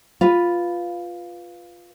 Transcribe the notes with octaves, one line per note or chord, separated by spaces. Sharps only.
F4 B4